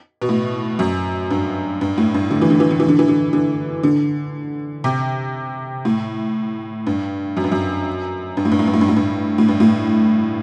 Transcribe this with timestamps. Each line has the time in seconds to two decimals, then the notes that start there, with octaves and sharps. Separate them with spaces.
0.22 B2
0.29 A2
0.79 F#2
1.31 G2
1.81 G2
1.98 A2
2.14 G2
2.31 D3
2.41 E3
2.50 D3
2.60 E3
2.70 D3
2.80 E3
2.89 D3
2.99 E3
3.08 D3
3.33 D3
3.83 D3
4.84 C3
5.85 A2
6.87 G2
7.37 F#2
7.44 G2
7.52 F#2
8.37 G2
8.45 A2
8.52 G2
8.59 A2
8.67 G2
8.74 A2
8.81 G2
8.88 A2
8.96 G2
9.38 A2
9.49 G2
9.60 A2